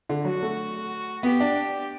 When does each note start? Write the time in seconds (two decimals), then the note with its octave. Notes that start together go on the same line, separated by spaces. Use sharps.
0.09 D3
0.25 F#3 F#4
0.42 A3
1.23 B3 G4
1.40 D4